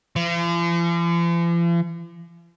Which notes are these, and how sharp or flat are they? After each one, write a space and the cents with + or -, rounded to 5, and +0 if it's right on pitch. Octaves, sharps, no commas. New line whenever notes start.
F3 -45